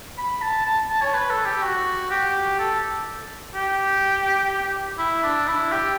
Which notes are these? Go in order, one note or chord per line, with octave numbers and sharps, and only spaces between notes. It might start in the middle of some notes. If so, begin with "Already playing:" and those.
B5
A5
A5
A5
C#5
B4
A4
G4
F#4
G4
A4
G4
E4
D4
E4
G4